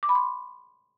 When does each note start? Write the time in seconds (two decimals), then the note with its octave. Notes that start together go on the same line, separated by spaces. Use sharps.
0.03 D6
0.09 B5
0.15 C6